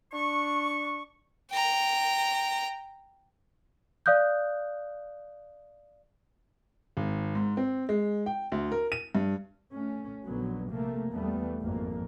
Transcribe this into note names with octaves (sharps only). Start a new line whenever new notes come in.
D4 C#6
G5 A#5
D5 F5 D#6 F#6 G6
G#1
G#2
C4
G#3
G5
D2
A#4
D#7
G2
A3 C#4
A#1 D3 F#3 B3
C3 A3 A#3
E2 G3 A3 B3
G#1 F2 A#2 A#3